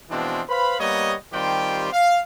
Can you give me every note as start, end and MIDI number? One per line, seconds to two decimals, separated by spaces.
0.10 0.42 47
0.10 0.42 52
0.10 0.42 53
0.10 0.42 56
0.10 0.42 60
0.10 0.42 62
0.49 0.78 71
0.49 0.78 72
0.49 0.78 77
0.49 0.78 83
0.79 1.14 55
0.79 1.14 58
0.79 1.14 59
0.79 1.14 73
0.79 1.14 75
1.33 1.89 51
1.33 1.89 55
1.33 1.89 60
1.33 1.89 65
1.33 1.89 67
1.33 1.89 79
1.93 2.19 77